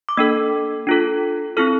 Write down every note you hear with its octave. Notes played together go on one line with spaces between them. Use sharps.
D6
A#3 D4 A4 E6
D4 F4 A4
C4 E4 A4 F6